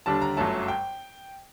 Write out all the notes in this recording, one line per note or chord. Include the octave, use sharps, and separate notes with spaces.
D#2 D3 G3 D4 A5
A#5
G1 F#2 F#3 A3 A5
G5